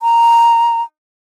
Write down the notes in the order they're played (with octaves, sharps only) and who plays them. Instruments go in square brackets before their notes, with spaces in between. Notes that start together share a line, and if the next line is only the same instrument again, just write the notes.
[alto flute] A#5